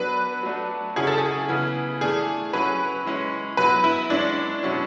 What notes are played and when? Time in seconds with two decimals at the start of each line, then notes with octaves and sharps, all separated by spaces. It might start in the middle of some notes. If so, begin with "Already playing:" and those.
Already playing: F#3 B3 D4 B4
0.43 F#3 A3 D4
0.96 C#3 F#3 C#4 E4 G#4
1.07 A4
1.18 G#4
1.49 C#3 E3 B3 E4
2.01 E3 A3 D4 G#4
2.53 F#3 C#4 E4 B4
3.05 E3 G#3 C#4 E4
3.57 F#3 B3 E4 B4
3.84 E4
4.10 E3 G#3 C#4 D4 E4
4.63 B2 F#3 C#4 E4